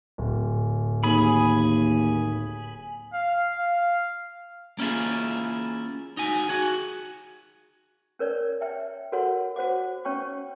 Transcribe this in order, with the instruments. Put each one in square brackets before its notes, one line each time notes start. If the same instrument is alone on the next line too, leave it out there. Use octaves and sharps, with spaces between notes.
[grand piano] D1
[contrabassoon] D#2 [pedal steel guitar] G#4 B5
[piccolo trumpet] F5
F5
[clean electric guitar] A#3 C#4 E4 F4 G#4
D#4 F#4 G#5
F#4 G#4
[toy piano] C#4 A#4 C#5 D5
E5 G5
F#4 A4 A#4 C#5 F#5 C6
F#4 C5 F#5 D6
C#4 C#5 G5 C#6